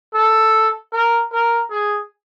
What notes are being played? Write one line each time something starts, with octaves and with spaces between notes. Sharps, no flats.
A4
A#4
A#4
G#4